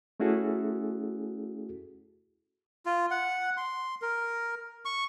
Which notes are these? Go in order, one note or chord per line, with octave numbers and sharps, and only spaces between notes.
A3 C#4 E4 F#4 G#4 A4
F4
F#5
C6
A#4
C#6